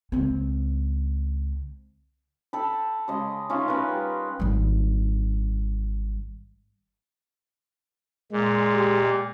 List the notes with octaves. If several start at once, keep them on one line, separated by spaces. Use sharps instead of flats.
C#2 C4
A4 G5 B5
C#3 G#3 D#5
A3 C#4 D#4 F4
C#4 A#4 B4
G3
G#1 G3
A#2 G#3
G4